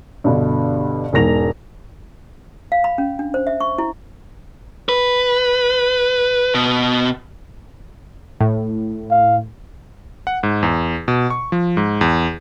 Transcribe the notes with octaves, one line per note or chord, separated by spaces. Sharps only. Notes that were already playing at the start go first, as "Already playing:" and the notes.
G2 B2 D3
E1 E2 G#2 A#6 F7
F5
B5
C#4
D4
C5
E5
C#6
E4
B4
B2
A2
F5
F#5
G#2
E2
B2
C#6
F3
G#2
E2